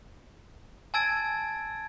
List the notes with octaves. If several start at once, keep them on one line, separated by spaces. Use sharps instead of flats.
G#5 A5 E6 G#6 A6 D7